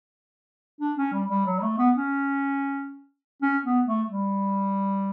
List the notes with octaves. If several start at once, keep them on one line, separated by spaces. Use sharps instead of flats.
D4
C#4
G3
G3
F#3
G3
A3
B3
C#4
C#4
B3
A3
G3